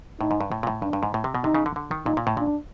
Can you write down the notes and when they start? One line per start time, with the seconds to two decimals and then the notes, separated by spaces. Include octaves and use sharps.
0.20 A2 D#4
0.31 G#2
0.41 G2
0.52 A2
0.63 A#2
0.67 A2
0.82 G2 D4
0.93 G2
1.03 G#2
1.14 A2
1.24 C3
1.35 B2
1.44 C3 D#4
1.54 C#3
1.66 D3
1.76 D3
1.91 D#3
2.06 A#2 D#4
2.17 A#2
2.27 A2
2.37 A#2 D4